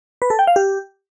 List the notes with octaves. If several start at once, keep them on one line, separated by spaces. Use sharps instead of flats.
B4
A4
G5
F5
G4